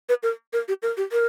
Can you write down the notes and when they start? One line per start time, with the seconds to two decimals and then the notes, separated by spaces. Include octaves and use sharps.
0.09 B4
0.23 A#4
0.53 A#4
0.68 G4
0.82 A#4
0.97 G4
1.12 A#4